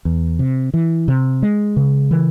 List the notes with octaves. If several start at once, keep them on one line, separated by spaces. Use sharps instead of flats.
E2
C3
E3
C3
G#3
C#3
E3